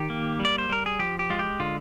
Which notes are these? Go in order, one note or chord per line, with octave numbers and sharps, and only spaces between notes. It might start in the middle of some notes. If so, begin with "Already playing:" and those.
Already playing: D#3 G4
A#3
G3
D5
C5
G3 A#4
G#4
F3 G4
G4
G#3 F4
G4
D3 F4